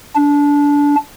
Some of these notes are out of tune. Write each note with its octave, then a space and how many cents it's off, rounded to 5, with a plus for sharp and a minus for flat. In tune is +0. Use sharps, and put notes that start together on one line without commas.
D4 -20